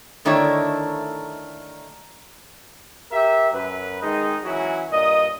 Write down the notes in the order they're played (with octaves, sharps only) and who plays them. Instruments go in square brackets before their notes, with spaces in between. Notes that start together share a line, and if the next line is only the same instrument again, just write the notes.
[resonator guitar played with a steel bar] D3 D#3 A3 D4 E4 C#5
[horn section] G4 A#4 E5
F#2 B4
D#3 G#3 C4 D#4
E3 F#3 C#4 E4 F#4
G2 A#2 D#5